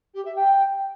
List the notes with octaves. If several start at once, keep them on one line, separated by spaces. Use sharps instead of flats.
G4
E5
G5